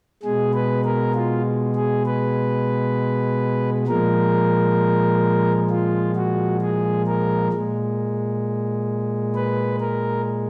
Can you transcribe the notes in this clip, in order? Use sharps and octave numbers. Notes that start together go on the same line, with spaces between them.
B2 G#3 G#4
B4
A#4
F4
G#4
B4
A#2 F3 G#3 A#4
F4
F#4
G#4
A#4
A#2 G#3
B4
A#4